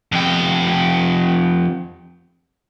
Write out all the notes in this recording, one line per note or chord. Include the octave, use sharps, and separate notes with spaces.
F2 G4